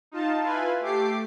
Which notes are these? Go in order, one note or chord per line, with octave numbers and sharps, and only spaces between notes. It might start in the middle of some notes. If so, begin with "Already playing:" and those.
D#4 F4 A5
E4 F4 B4 G#5
A3 G4 D6 C7